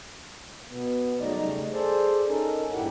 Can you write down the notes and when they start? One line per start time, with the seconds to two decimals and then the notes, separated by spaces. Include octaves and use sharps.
0.69 B2 B3
1.20 E2 F#3 A3 D#4 D5 D#5
1.34 C#3 G3 A3 D#4 A#5
1.72 G#4 A4 C5 D5
2.27 C#4 D#4 A4 A#4
2.72 E2 G2 A#2 E4 G4 F#5